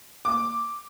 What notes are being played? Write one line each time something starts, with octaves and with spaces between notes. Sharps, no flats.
D6